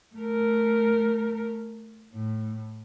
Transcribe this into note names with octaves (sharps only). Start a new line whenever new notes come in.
A3 A#4
A2